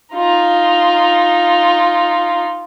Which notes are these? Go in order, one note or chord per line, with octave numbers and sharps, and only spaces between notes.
D#4 F4